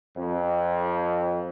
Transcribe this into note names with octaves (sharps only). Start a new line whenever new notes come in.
F2